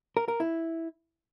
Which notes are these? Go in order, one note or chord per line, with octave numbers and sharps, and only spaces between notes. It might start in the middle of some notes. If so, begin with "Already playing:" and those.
A#4
A#4
E4